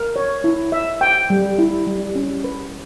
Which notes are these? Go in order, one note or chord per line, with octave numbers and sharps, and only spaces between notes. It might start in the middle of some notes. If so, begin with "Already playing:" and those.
Already playing: A#4
C#5
E4
E5
G5
G3
E4
G3
C#4
B4